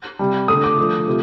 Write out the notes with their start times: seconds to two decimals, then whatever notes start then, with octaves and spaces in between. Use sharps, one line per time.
0.19 C3 G3
0.48 D3 A3 D#6
0.64 D6
0.78 D3 F3 A3
1.07 C3 F3 A3